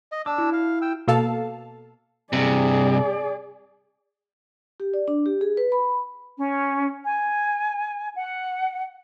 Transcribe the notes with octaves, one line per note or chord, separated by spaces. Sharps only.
D#5
D4 D6 E6
E4 F#4
F5
G5 E6
B2 A#3 A4 F5 A5
G2 C3 G#4 D5
G4
D5
D4
G4
G#4
B4
B5
C#4
G#5
F#5